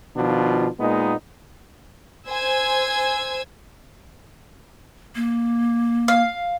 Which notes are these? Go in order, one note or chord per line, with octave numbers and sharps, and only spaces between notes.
B2 D#3 F3 D4 F4
A#2 G#3 A#3 B3 D#4
C5 G#5 E6 G#6
A#3
F5